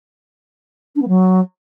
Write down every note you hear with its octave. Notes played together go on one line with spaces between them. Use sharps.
D4
B3
F#3